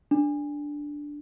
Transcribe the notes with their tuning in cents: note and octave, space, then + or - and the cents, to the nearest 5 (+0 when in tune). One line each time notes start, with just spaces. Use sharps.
D4 -5